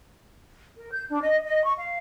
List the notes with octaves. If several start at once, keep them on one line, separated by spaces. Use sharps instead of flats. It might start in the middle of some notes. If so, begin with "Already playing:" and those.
A#4
G6
D4
D#5
D#5
C#6
F5